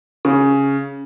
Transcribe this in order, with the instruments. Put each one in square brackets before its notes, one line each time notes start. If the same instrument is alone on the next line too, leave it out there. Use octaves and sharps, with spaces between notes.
[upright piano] C#3